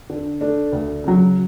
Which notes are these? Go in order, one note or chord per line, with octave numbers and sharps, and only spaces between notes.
D3
A3 D4
D2
C#3 F#3